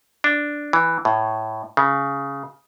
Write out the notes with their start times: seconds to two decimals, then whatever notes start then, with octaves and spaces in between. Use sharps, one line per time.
0.24 D4
0.73 E3
1.05 A2
1.77 C#3